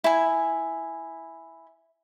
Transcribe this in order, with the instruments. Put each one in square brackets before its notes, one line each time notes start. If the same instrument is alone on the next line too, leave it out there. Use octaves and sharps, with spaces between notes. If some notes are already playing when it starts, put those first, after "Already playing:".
[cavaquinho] E4 G#5